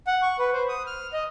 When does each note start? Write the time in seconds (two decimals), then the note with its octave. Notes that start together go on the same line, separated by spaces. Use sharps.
0.07 F#5
0.22 C#6
0.39 B4
0.53 C5
0.69 D#6
0.87 F6
1.13 D#5